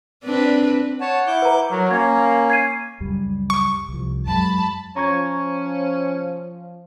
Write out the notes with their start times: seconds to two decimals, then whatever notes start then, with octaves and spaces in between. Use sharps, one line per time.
0.24 C4 D4 B4
1.01 C#5 F#5 A5
1.27 E4 D6 G6
1.42 B4 A#5
1.71 F#3 A#4
1.91 A#3 C#4 G#6
2.50 G#6 C7 D#7
3.00 C#2 F#2 G3
3.50 C#6
3.89 C2 F3
4.27 F#2 F#3 G#3 A5 B5
4.96 F3 C#4 A#5 C#6 G#6